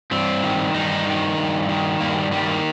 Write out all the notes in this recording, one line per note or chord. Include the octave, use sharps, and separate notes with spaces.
G2 C4
D#3
G2 D#4
D#3
G2
D#3
G2 A#3
G3
D#3 G3
A#3